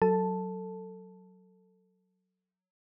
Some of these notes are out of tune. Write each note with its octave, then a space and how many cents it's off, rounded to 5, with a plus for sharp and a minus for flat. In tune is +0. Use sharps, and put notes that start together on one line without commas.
F#3 +0 A4 +15 A5 +0